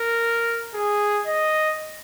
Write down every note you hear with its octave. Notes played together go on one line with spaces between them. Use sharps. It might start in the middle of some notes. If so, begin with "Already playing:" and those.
Already playing: A#4
G#4
D#5